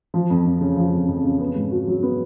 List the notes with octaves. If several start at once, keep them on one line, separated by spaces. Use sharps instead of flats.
F3
F2
F2
C#3
F3
F2
F2
C#3
B3
G#2
F#4
F#3
B3